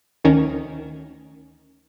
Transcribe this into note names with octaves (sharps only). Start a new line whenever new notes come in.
D2 D#3 C#4 A#5 G#6